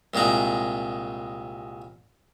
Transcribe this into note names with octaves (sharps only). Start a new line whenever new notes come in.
C2 A#2 G#3 A#5